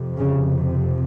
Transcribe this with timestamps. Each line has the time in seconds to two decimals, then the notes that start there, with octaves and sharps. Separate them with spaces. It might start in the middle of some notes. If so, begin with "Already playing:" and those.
Already playing: F2 C3
0.18 C#3